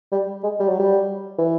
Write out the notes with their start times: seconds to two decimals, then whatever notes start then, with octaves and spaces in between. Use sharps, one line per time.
0.12 G3
0.44 G#3
0.60 G3
0.69 F#3
0.80 G3
1.38 E3